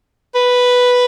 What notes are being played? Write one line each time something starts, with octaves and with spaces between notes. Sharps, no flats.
B4